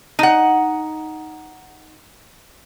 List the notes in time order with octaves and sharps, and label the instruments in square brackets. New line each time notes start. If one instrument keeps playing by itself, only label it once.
[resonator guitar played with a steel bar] D#4 F#5